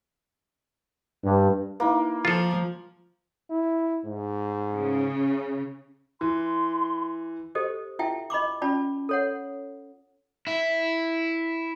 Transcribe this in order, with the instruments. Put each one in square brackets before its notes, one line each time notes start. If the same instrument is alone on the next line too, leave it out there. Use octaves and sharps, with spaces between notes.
[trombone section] G2
[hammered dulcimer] A#3 [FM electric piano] D#4 E4 B4
[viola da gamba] F3 [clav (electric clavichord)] F4 A4
[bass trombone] E4
G#2
[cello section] C#3
[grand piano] E3 [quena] C6
[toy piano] G4 A4 C5 D#5
E4 F4 E5 G5 A5
D#5 B5 C#6 D6
C#4 F4 D5 A5 B5
A4 C#5 F#5
[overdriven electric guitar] E4 E5